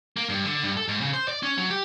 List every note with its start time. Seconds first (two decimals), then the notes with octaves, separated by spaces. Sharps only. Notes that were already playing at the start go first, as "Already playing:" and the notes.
0.17 A#3
0.29 G2
0.45 D3
0.63 G2
0.77 A4
0.88 G#2
1.01 C#3
1.13 C5
1.28 D5
1.43 C#4
1.58 F#3
1.70 G4